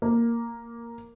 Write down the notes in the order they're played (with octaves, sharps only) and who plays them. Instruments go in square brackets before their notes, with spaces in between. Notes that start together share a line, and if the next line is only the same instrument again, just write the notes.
[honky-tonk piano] A#3